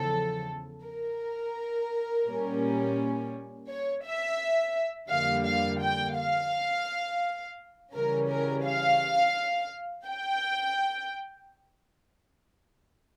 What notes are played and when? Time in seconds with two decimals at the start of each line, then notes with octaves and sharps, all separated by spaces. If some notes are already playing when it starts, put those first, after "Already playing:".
Already playing: E2 C#3 F3 A4
0.85 A#4
2.27 A#2 G3 A#3 C#4
3.69 C#5
4.05 E5
5.10 F2 D3 G3 A#3 F5
5.45 F5
5.82 G5
6.17 F5
7.94 C#3 E3 G3 C#4 A#4
8.29 A#4
8.66 F5
10.07 G5